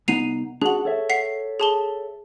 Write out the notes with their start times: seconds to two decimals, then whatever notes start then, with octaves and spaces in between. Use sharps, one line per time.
0.08 C2 B3 D#4 C7 D#7 F7
0.62 D4 F#4 G#4 F#5 F#7
0.85 A4 C#5 E5
1.09 F#5 B6 C7
1.60 G#4 A5 G7